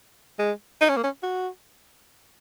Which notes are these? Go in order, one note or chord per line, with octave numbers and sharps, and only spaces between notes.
G#3
D#4
C#4
A#3
C#4
F#4